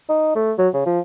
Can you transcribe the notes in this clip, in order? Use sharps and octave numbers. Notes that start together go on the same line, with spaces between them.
D#4
A3
F#3
C#3
F3